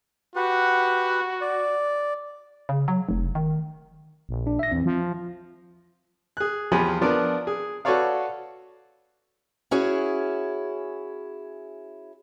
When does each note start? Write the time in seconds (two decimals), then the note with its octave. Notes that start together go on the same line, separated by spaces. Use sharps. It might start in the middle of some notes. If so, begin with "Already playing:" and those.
0.36 F#4 G4 B4 F#5
1.41 D5
2.69 C#3
2.88 F#3
3.09 F1
3.35 D#3
4.29 A#1
4.47 D4
4.59 E5 A#6
4.72 E2 C4
4.86 F3
6.37 G#4 F#6
6.72 E2 F3 G4 G#5 B5
7.01 F3 B3 D4 A#4 D5
7.47 G#4
7.85 F#4 A4 B4 C#5 D5 F5
9.71 C#4 E4 F#4 G#4 C#5